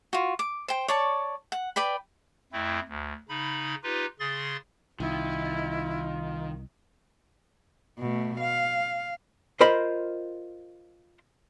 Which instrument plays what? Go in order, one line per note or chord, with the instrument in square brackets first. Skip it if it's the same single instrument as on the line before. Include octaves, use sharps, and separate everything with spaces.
[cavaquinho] F4 F#4
D6
C5 G5
C#5 D5 A5 C#6
F#5
B4 D5 G5 B5
[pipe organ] F2 A3 C4 E4
D2
C#3 D#4 B5
D#4 F4 G4 B4
C#3 G#4 C6 A6
[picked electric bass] C2 [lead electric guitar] D#3 [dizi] E4 [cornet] F4
[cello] B2 A3
F5
[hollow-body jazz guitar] F4 A#4 C5 D#5 B5